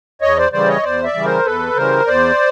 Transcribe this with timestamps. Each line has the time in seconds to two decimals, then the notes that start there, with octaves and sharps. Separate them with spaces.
0.21 E2 C#5 D#5
0.37 C5 D5
0.52 C#3 E3 G3 C5 D5
0.68 C#5 D#5
0.83 E2 C5 D5
1.04 D5 E5
1.15 C#3 E3 G3
1.25 A#4 C5
1.45 E2 A4 B4
1.76 C#3 E3 G3 A#4 C5
2.07 E2 C5 D5